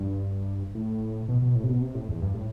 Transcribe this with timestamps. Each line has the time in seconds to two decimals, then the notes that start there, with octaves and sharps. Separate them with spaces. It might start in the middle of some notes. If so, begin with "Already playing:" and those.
Already playing: G2
0.75 A2
1.29 B2
1.42 B2
1.55 A2
1.64 C3
1.68 B2
1.82 C3
1.95 A2
2.08 E2
2.21 G2
2.34 A2